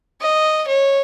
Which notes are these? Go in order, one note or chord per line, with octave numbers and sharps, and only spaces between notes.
D#5
C#5